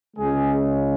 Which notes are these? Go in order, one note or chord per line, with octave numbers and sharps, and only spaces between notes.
C#2 C#3 G#3 G#4